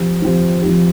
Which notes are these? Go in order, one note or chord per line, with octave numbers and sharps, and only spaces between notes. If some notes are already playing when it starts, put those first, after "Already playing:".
Already playing: F3 C4 G4
F3 C4 G4
F3 C4 G4